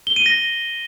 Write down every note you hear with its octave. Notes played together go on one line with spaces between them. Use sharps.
G7
D#7
A#6